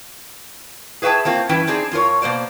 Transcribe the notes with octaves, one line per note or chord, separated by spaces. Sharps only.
G#4 B4 E5 F5 G5 A5
A#3 C4 F4
G2 E3 C#4 E4 B4 G5
C4 D4 D#4 G#4
F2 F4 A#4 C#5
B2 A#3 C5 D5